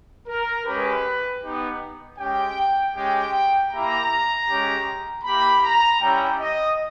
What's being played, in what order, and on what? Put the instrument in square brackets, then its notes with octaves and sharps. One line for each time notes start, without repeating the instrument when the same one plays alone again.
[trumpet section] A#4
G#3 C#4 G4 B4
B3 D#4 G4
G#3 C#4 G4 G5
G#3 C#4 G4 G5
A#3 E4 G4 A#5
G#3 C#4 G4
A#3 E4 G4 B5
A#5
G3 C#4 E4 G5
D#5